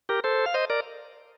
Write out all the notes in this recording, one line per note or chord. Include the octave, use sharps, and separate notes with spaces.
G4 A#4
A4 C5
F5
C5 D#5
A#4 D5